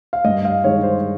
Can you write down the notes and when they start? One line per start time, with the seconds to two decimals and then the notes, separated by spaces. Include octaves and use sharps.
0.13 F5
0.24 G2 D#5
0.45 F5
0.64 D#3 G#3 C#5
0.83 C5